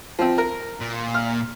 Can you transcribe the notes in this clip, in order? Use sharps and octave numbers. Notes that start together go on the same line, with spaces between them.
F3 C4
A#4
A#2
F6